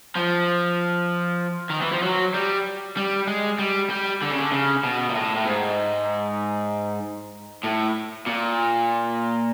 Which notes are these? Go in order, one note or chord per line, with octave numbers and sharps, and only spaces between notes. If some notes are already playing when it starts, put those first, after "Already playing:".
F3
D#3
E3
F3
F#3
G3
G3
G#3
G3
G3
D3
C#3
D3
C#3
B2
A#2
A2
A2
G#2
A2
A#2